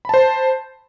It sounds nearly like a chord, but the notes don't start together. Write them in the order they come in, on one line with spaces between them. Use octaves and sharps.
B5 A5 C5